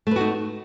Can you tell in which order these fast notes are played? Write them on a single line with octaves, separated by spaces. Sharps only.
A3 B4 F#4 D#4